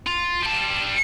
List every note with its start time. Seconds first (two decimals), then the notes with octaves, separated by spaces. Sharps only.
0.06 F4
0.43 G3 A5